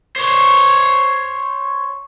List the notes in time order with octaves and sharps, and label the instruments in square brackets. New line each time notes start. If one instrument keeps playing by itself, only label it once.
[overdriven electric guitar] C5 C#5